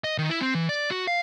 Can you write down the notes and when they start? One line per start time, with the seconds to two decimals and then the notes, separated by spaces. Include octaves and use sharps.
0.04 D#5
0.18 D#3
0.30 E4
0.41 C4
0.55 E3
0.69 D5
0.91 F#4
1.07 F5